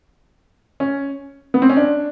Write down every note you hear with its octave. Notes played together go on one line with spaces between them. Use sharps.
C#4
B3
C4
C#4
D4